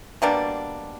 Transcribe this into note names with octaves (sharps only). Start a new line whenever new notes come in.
B2 G3 A#3 D4